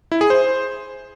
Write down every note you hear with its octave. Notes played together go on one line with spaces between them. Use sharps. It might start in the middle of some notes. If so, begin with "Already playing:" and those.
E4
G#4
C5